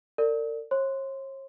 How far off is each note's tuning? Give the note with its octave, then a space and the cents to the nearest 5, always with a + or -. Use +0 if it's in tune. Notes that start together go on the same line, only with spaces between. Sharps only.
A#4 -40 D5 +0
C#5 -45 C6 -15